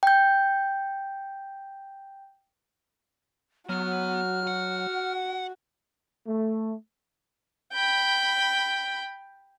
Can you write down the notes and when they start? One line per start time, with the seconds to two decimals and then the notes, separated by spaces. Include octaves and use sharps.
0.03 G5 G6
3.69 F#3 B3 F#4 F6
4.47 F#4 F#5
6.27 A3
7.73 G5 B5